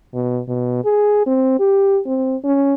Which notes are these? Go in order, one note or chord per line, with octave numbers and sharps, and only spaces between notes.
B2
B2
G#4
C4
G4
C4
C#4